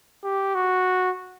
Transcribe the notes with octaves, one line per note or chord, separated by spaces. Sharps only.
G4
F#4